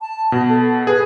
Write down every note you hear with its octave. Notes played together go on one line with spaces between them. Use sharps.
A5
B2
A4
G#4 B4